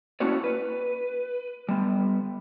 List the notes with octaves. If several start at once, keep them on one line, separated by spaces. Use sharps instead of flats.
A#3 C#4 E4 F#4 C#5 D5
B4
G3 B3